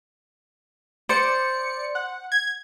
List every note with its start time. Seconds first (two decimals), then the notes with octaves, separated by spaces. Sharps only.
1.09 C5 D5 C#7
1.95 F#5
2.32 G#6